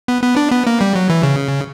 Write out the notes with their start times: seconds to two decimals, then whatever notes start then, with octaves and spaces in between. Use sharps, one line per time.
0.08 B3
0.23 B3
0.36 D4
0.51 B3
0.67 A#3
0.81 G3
0.95 F#3
1.10 E3
1.23 C#3